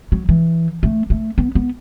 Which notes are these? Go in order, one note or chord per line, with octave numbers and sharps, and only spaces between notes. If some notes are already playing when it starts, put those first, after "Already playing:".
F#3
E3
A3
A3
B3
B3